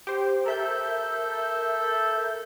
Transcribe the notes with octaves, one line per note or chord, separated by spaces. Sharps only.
G4 C5
A4 A#4 E5 G6